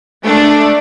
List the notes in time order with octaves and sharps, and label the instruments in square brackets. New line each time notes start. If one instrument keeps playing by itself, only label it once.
[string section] A3 D4